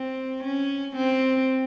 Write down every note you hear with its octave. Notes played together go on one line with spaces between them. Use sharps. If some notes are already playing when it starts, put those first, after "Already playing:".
Already playing: C4
C#4
C4